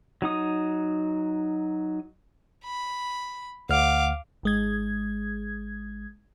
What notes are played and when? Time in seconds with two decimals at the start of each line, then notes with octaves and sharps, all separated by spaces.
0.22 F#3 D#4 D#6
2.64 B5
3.69 D2 F5 F#5 D6 F6
4.43 G#1 G#3 G#6